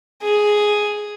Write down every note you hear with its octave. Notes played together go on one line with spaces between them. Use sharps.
G#4